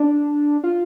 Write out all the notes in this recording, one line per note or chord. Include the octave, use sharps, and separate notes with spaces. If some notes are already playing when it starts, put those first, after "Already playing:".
Already playing: D4
F4